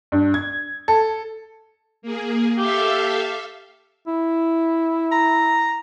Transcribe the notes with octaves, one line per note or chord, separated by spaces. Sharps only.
G2
G#6
A4
A#3 G#4
G4 A4 E5 F5
E4
A#5